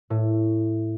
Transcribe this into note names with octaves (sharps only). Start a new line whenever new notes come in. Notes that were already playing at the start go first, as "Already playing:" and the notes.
A2